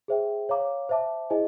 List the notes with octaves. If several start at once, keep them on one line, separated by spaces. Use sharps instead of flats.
G#4 C5 E5 G5
C#5 F5 A#5 D6
C5 E5 A5 D6
E4 G#4 C5 D#5 G#5